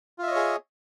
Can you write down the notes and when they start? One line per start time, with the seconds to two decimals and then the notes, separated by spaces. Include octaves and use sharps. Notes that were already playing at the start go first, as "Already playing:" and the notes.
0.19 F4
0.23 E5
0.27 D#5
0.31 C#5
0.36 G#4